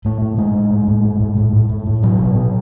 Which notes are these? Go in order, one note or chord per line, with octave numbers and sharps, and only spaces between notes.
A2 A3
A2
A2 G#3
A2
A2
A2
A2
A2
A2
A2
A2
A2
B2 F#3
B2
B2